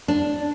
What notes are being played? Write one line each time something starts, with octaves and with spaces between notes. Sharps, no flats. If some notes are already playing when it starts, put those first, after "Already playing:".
D4